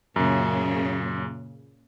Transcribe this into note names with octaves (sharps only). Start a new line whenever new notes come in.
F#2 A#2 C#3